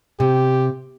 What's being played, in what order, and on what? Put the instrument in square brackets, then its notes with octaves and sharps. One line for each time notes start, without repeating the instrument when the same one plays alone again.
[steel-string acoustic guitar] C3 [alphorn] G4